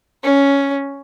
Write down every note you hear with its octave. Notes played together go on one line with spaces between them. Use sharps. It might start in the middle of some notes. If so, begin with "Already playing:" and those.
C#4